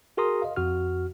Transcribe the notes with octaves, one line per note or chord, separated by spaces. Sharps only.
F#4 G#4 A#4 A#5 C6 D#6
D#5 F5
F2 F#4 F6